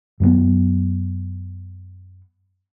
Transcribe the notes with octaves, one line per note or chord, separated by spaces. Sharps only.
F#2 F#3 G#3 B3